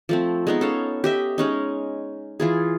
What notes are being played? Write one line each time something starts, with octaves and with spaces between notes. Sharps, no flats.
F3 A3 C4
G#3 B3 D#4
C#4 A4 F5
G4 D#5 E5
G#3 C#4 D#4
E3 F4 G#4